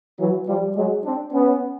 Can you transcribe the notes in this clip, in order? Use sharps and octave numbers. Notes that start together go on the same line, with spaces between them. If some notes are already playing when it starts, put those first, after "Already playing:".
E3 F#3
F3 G3
F#3 G#3
C4 D4
B3 C#4